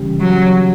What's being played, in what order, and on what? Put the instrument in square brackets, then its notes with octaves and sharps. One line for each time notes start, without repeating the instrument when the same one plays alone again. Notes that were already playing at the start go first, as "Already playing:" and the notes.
Already playing: [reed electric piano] C#3 E3 G3 C#4 G4
[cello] F#3